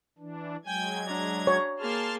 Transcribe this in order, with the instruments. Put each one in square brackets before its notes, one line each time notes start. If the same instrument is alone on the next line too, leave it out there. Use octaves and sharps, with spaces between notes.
[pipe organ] E3 D4
[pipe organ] F#3 G#3 G#6 [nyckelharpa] G5 G#5
[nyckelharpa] D4 A#5
[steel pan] C#5
[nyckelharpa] A#3 G#4 [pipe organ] A5 C6 F6